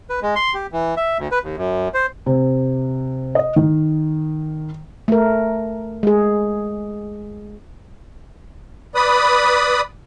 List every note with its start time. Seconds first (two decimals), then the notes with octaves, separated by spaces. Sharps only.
0.10 B4
0.22 G#3
0.36 C6
0.54 G4
0.72 E3
0.97 E5
1.19 D2
1.31 B4
1.44 D#2
1.57 F#2
1.94 C5
2.26 C3
3.35 D#5
3.56 D#3
5.08 A3 A#4
6.03 G#3 G#4
8.95 B4 D5 B5 D#6